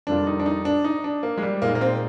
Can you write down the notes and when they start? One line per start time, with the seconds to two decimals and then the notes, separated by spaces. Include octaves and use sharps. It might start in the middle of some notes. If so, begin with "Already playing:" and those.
0.07 F2 C3 G3 A#3 D4 F4
0.27 D#4
0.40 D4
0.46 D#4
0.65 D4
0.84 D#4
1.04 D4
1.23 A#3
1.37 G#3
1.43 G3
1.62 A#2 G#3 A#3 D#4
1.75 A#3
1.81 C4